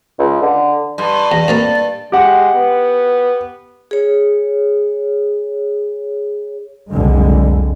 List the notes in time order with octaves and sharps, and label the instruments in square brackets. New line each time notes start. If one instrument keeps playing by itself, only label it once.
[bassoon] C#2
D3
[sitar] G2 [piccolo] C6
[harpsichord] E2 [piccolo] A#6
[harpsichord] F2 A3 A#3 [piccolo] A6
[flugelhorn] G#3 [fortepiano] G4 F#5
[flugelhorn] B3
[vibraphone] G#4 C#5
[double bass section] F#1 C2 F2 D3 G3 G#3